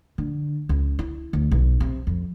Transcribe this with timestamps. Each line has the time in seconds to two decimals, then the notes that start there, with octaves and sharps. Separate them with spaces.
0.18 D3
0.69 C#2
0.99 E4
1.33 D2
1.52 B1
1.80 C3
2.07 F2